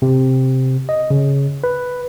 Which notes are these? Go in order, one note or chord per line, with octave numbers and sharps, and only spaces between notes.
C3
D#5
C#3
B4